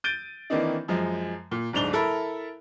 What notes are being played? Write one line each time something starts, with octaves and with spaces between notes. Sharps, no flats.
G6 A6 D7 D#7 G7
D#3 E3 A#3 C4 D4 D#4
F#2 F3 G#3
A#2
D1 G#2 D4 F7 G7
E4 A4 A#4 E5 B5